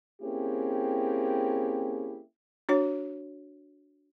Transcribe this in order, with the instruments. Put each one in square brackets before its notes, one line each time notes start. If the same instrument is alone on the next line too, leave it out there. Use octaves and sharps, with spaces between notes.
[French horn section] A#3 C4 C#4 E4 G4 G#4
[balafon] D4 F#4 C#5